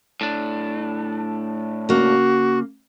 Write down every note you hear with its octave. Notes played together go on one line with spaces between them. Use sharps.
A2 D4
C#3 A#3 F#4